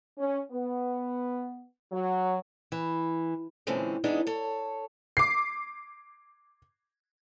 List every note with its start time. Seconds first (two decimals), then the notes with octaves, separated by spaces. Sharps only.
0.17 C#4
0.51 B3
1.91 F#3
2.72 E3
3.67 A#2 D3 E3 G#3 C4 C#4
4.04 F#2 E3 G#3 B3 D4 D#4
4.27 A4 C#5
5.17 D6 C7